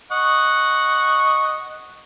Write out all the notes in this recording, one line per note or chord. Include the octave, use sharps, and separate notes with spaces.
D#5 F#5 C#6